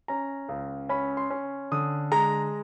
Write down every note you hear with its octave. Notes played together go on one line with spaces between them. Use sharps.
C#4 A#5
C#2
C#4 B5
C6
C#4
D3 D#6
G#3 A#5